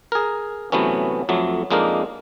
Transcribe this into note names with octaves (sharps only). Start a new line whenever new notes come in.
G#4 A#4
C3 E3 F#3 A3 B3 C#4
F2 F#3 A3
F2 G#3 A#3 D4 D#4 A#4